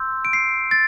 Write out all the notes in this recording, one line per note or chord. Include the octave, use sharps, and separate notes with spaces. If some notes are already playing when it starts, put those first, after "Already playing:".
Already playing: C6 E6 G6
D7
C7
A6